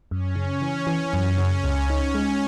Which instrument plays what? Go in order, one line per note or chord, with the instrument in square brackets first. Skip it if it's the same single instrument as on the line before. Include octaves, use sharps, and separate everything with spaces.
[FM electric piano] F#2 [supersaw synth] C#4
[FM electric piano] C#3
E3
E3
F#2
C#3
[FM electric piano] C#2 [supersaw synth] C#4
[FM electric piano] D#4
G#3